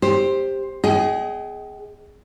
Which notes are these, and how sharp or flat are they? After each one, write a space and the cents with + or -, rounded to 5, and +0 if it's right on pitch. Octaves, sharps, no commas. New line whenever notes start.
G4 +10 C5 +10
G#4 +0 D#5 +30 G5 -40